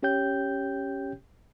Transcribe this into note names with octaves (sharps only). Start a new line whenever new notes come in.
C#4 G4 C#5 G5 G6